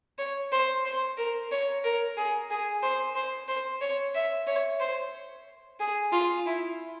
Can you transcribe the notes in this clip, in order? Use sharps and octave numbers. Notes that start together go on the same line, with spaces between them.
C#5
C5
C5
A#4
C#5
A#4
G#4
G#4
C5
C5
C5
C#5
E5
C#5
C5
G#4
F4
E4